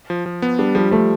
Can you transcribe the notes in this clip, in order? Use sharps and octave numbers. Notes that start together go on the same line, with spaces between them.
F3
F3
B3
G3 D4
F3 G3
F3 A3